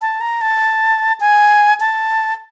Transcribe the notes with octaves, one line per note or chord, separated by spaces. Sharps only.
A5
A#5
A5
G#5
A5